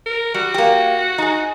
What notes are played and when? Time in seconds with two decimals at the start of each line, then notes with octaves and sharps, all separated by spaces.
0.06 A#4
0.34 G3 F#4
0.54 A#3 G4
1.18 D#4 G#4